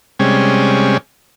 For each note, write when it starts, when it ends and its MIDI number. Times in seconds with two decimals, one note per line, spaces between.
0.19 0.97 48
0.19 0.97 55
0.19 0.97 56
0.19 0.97 61